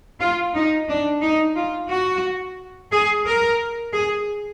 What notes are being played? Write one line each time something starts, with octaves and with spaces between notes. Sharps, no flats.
F4
D#4
D4
D#4
F4
F#4
G#4
A#4
G#4